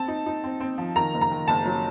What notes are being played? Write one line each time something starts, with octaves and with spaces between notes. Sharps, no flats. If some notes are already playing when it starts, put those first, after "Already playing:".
Already playing: C4 A5
D#4
D#4
C4
C4
F3
D#3 A#5
F#1
A#5
D#3
F#1 A5
F#3